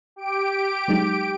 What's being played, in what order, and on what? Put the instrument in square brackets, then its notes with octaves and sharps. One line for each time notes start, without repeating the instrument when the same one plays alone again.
[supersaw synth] G4 D7
[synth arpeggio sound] F#3 G#3 D#4